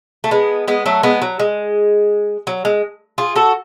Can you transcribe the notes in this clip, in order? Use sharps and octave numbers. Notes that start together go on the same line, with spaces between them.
A3
G#3 B3
G#3 B3
F#3 A3
G#3 B3
F#3
G#3
F#3
G#3
F4 G#4
F#4 A4